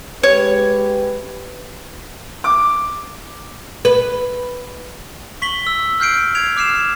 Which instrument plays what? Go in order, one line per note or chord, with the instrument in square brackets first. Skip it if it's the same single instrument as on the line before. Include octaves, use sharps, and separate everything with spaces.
[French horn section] G#3 G4 B4 [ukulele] C#5
[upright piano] D6
[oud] B4
[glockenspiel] C#6 B6 F#7 G7
E6
F6 G6 C7 D7
G#6 C7 D7 F7
D6 F6 C7 E7